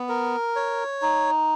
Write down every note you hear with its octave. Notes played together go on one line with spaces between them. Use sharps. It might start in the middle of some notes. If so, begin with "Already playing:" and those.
Already playing: B3
A#4
C#5
D#4